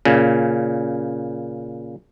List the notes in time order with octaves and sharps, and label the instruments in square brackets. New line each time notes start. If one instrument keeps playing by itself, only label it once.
[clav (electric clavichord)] A#2 C#3